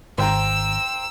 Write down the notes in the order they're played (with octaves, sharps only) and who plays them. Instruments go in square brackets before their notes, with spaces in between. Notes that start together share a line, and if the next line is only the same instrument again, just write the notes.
[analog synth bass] G#1 [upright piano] C5 G5 A#5 [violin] E6 E7